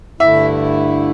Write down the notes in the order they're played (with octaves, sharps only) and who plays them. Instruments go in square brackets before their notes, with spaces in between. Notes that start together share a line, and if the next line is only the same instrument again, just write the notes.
[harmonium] G2 D3 A3 E4 [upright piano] E5